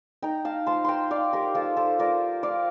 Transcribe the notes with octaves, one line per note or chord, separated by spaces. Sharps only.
D#4 G5 A#5
F5 A5
F3 A5 C6
G5 A#5 C6
D#4 D5 F5
G4 A#4
F3 F4 A4
A4 C5
F4 A#4 D5
F3 D5 F5